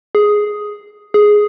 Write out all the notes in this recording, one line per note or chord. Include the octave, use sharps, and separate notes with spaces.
G#4
G#4